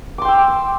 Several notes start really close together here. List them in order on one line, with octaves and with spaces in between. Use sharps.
D6 C6 G5 E6